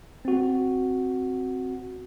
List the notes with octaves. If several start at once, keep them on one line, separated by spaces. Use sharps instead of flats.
C4 F#4